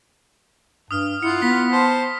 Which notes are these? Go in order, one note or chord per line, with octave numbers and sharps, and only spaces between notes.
G2 D#6 F6
E4 F4 F#5 C#7
B3 B6
C5 A5